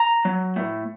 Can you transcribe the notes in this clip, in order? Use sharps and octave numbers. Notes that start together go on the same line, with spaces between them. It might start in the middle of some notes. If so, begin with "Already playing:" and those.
Already playing: A#5
F#3
A2